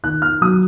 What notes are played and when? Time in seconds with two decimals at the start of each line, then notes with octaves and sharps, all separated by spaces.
0.03 D#3 F#6
0.22 F6
0.41 F#3 D#6